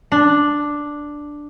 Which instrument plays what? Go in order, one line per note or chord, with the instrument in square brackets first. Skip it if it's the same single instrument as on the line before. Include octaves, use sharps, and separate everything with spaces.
[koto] D4